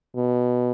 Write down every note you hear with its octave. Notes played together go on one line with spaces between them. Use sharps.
B2